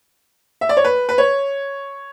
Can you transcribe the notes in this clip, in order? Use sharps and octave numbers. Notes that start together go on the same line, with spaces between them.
E5
D5
C#5
B4
B4
C#5